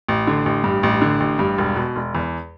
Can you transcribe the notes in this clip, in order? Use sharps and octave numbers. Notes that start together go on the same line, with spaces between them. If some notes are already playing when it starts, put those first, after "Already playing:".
A1
D3
A1
G2
A1
D3
A1
G2
E1
B2
E1
E2